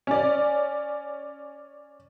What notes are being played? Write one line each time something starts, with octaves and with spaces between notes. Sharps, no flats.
C#4 D5